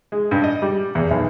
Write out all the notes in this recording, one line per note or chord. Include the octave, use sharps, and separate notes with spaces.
G#3
G2
D#5
G3
E2
B1